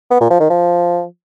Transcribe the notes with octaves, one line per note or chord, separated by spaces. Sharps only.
B3
A#2
F3
D#3
F3